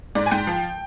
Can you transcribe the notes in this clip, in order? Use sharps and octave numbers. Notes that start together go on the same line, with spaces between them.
G#2 D5
G#5
G#2 G5
F3